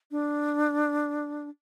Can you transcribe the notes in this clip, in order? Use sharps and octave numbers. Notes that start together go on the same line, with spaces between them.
D4